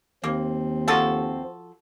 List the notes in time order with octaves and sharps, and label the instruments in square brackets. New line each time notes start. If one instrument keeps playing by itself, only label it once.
[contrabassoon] D#2 [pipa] A#3 [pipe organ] C4
[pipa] F3 F#4 A4